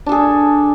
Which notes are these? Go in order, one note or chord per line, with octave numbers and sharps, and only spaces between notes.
D4 G#4 A4